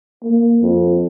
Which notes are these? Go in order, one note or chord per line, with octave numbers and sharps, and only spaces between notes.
A#3
F2